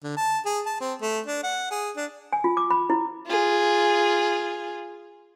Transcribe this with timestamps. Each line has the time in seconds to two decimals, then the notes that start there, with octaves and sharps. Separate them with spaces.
0.04 D3
0.17 A5
0.46 G#4
0.66 A5
0.81 C4
1.01 A3
1.26 D4
1.43 F#5
1.71 G#4
1.97 D4
2.33 G#5
2.44 F4
2.57 D6
2.70 B5
2.90 E4
3.27 F4 G#4